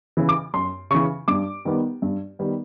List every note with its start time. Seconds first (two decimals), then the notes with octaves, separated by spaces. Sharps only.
0.17 C#3 E3
0.29 D6
0.54 F#2 C6
0.91 C#3 E3 C#6
1.28 G2 D6
1.65 D#3 G3 B3
2.02 G2
2.39 D#3 G3 B3